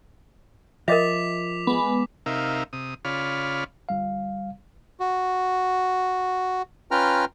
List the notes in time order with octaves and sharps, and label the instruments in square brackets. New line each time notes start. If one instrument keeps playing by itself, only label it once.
[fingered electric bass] F3 [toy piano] A#4 D#5 E5 [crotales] D6 B6 F7
[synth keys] G#3 B3
[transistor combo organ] C3 D#4 A#4 E5 F5
C3 D#6
C#3 F4 C#5 D5 B5 F6
[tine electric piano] G1 G3 F5
[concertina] F#4
C#4 F4 B4 G5 A#5 F6